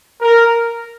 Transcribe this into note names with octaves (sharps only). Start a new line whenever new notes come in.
A#4